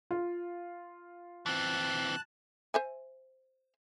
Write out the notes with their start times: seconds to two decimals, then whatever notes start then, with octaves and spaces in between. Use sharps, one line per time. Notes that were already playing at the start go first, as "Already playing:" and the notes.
0.11 F4
1.46 E3 C4 A5 F#6
2.74 C5 E5 G#5